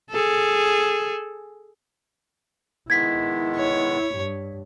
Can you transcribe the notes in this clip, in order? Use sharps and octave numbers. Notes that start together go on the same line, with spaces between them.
G#4 A4
D#3 G#3 B3 E4 G#6 B6
C#5
G2